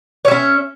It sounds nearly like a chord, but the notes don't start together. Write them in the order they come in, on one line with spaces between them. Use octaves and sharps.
C#5 E5 C#4